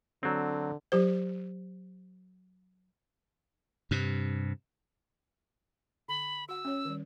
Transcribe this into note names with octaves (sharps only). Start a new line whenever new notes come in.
D3 F#3 C4
F#3 G4 C5
G2 C3
D3 B5
F#4 F#5 E6
C#4 C#5
D#3 G3